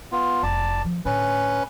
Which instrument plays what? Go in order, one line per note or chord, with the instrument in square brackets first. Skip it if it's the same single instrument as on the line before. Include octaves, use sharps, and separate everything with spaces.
[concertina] B3 F4
[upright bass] F1 [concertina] D5 A5
[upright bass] F3
[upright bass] A2 D3 [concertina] C#4 B4